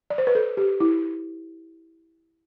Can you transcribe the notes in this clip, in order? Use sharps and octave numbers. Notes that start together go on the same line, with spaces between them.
D5
C5
B4
A4
G4
E4